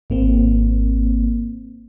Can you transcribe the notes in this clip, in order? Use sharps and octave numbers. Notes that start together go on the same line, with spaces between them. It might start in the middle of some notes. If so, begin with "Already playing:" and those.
G#1 A#3 C4